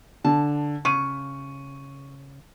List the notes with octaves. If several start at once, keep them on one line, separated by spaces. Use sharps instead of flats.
D3 A5
C#3 C#6 D#7